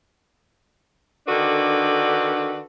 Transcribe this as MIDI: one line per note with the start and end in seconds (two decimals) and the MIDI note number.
1.27 2.60 50
1.27 2.60 51
1.27 2.60 62
1.27 2.60 66
1.27 2.60 69
1.27 2.60 71